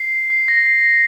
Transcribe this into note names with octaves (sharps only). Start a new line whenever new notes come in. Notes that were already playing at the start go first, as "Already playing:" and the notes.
Already playing: C7
C7
A#6
C7